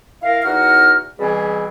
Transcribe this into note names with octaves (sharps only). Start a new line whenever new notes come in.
E4 A#4 F5
E2 D#4 F#4 F#5 F6
B2 E3 G3 C4 G#4